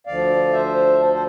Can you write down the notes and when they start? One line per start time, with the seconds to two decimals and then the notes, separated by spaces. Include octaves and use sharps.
0.07 D2 D3 F3 D5 F5
0.53 C5 E5
0.99 A4 C5
1.13 C5